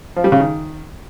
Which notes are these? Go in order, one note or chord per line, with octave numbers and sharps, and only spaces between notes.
F3
G3
C#3
D#3